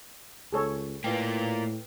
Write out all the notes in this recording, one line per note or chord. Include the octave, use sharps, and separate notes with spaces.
C#2 G#4 A4 C#5
A2 A#3 D#4 F4 B4 G5